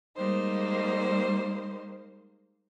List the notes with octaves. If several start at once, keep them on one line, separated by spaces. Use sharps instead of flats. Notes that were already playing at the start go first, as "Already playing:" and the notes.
G3 G#3 A#3 D#4 C5